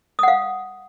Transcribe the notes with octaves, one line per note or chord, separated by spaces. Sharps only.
F5 F#5 D#6